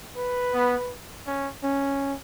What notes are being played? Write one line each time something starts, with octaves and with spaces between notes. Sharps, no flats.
B4
B3
C#4
C#4